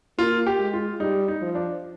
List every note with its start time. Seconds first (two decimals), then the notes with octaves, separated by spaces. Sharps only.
0.18 A#3 F4
0.47 G4
0.59 G#3
0.73 F4
1.00 G3 D#4
1.28 D#4
1.42 F3
1.55 D4